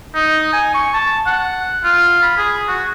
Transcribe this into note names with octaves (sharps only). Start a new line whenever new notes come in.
D#4
G#5
C#6
A5
F#5
F4
B5
G#4
F#4